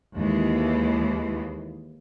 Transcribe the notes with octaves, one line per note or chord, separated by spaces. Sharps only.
D#2 E3 G#3